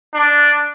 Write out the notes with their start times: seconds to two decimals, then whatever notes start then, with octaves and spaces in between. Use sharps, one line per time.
0.14 D4